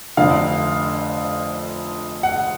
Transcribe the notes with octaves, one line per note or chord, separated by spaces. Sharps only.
F1 F2 D3 F5
F#5